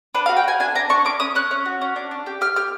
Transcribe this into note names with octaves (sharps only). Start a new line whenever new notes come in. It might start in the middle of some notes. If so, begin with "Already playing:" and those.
D4 B4
F5
F#4
G5
F#4 G#5
D4 G#5
D4 A#5
D4 C#6
C#4 D6
C#4 D#6
C#4 F#6
C#4
F#4
C#4
D4
D4
G4
G4 F6
G4 F6